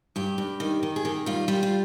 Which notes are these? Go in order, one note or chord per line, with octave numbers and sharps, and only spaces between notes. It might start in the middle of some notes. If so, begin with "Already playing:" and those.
G2 G4
G2
D#3
D#3
G#4
D#3 G4
G3 F4
G3 F4
F4